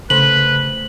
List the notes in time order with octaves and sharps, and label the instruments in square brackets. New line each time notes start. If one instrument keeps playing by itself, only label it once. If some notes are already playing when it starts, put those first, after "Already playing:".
[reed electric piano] C#3 [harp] A3 C5 [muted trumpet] B4 [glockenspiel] F#7